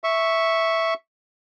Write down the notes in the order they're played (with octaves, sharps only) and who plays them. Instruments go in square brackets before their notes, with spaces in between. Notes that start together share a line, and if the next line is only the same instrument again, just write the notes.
[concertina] E5 C#6